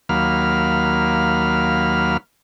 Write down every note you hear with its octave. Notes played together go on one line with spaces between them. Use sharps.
D#2 F#3 A#3 F5 B5 F6